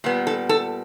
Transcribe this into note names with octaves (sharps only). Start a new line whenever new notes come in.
A#2 G3 B3
A4
A4